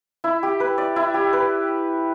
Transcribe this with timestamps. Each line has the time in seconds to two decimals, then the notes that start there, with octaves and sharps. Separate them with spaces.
0.24 E4
0.43 G4
0.60 B4
0.78 D5
0.96 E4
1.14 G4
1.33 B4